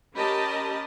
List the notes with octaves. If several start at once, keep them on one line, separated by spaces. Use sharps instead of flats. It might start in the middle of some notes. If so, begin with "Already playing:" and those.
C#4 G4 A#4 D#5 A5 B5